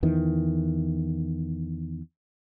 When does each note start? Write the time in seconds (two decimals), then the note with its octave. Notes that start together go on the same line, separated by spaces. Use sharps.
0.03 E2 D#3 E3